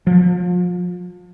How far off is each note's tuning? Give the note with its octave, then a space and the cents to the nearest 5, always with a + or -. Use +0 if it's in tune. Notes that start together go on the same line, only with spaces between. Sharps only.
F3 +35